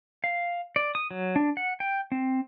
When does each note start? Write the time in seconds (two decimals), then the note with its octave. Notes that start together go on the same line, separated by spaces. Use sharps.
0.24 F5
0.76 D5
0.95 D#6
1.11 F#3
1.36 D4
1.57 F#5
1.80 G5
2.12 C4